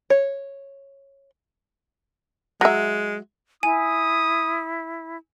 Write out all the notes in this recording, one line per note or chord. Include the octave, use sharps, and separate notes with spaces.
C#5
F#3 G#3 E5
E4 G#5 D#6